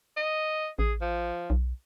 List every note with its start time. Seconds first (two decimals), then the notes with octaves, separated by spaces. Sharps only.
0.17 D#5
0.79 A1 G#4
1.01 F3
1.50 B1